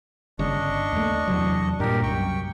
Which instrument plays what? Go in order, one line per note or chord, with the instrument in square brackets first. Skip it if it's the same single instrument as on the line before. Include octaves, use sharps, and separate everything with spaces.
[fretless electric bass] G1 C#3 [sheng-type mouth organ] D4 D#5 C#6
[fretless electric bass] D#2 A3
E2 C3 F#3
[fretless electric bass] G2 A#2 [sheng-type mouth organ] G4 A#4
[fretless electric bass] C2 F#2 [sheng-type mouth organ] G5 C#6